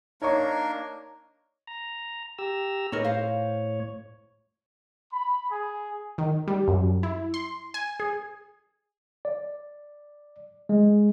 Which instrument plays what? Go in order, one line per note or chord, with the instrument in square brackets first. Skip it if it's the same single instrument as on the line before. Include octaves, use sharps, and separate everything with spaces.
[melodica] A#3 D4 A#4 [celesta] D#4 [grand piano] C#5 D#5 C#6
[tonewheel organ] A#5
G4 A#5 E6
[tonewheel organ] A2 C#5 [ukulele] D#4 A#4 B4
[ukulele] C5 F5
[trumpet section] B5
G#4
[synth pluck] D#3
G3
F#2
E4
C6
G#5
G#4
[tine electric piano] D5
G#3